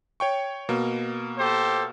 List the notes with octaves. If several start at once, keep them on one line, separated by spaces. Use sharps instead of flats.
C#5 G5 C#6
B2 A#3
G4 A4 C5